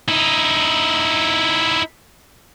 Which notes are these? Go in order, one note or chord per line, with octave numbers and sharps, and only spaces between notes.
D#4 E4